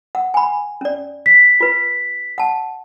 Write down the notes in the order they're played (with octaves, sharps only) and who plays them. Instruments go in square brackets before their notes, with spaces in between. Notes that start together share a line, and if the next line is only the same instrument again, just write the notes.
[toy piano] F#5
G#5 B5
C#4 D5
[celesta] B6
[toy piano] F4 B4
F#5 A5